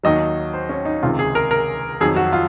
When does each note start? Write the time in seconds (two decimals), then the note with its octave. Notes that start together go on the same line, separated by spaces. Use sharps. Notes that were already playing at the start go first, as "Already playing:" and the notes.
0.03 D#2 D#3 F#3 D#5
0.54 C5
0.69 C#4
0.85 D#4
1.02 C#2 C3 D#3 F4
1.19 G#4
1.35 A#4
1.51 A#4
2.00 F2 D#3 F#3 G#4
2.16 F#4
2.33 F4